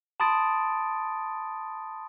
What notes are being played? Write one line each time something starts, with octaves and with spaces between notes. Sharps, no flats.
A5 B5 C6 D#6 A6 D7